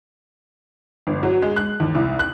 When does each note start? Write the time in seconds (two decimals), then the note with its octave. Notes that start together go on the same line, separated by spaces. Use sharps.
1.07 G1
1.23 F#3
1.42 G#3
1.56 F#6
1.80 D#2
1.95 C2
2.19 F#6